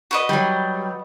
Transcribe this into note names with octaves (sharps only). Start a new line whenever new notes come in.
F#4 B4 D#5
F#3 G3